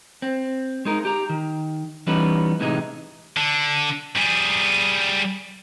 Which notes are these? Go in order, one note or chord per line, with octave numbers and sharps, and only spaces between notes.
C4
G#3 D#4 A#4
G4 A#5
D#3
E3 G3 B3 C#4 D#4 B4
A2 C3 E3 G#3 D4 D#4
D3
G3 G#4